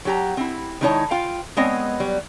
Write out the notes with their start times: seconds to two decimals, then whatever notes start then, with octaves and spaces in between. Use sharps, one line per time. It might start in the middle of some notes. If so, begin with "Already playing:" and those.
0.05 F#3 G4 A#5
0.37 C4 E4
0.81 D#3 G#3 D#4 E4 C#5 A5
1.11 F4 F5 G5
1.57 G#3 B3 C4 C#5 D#5
2.00 F#3 G3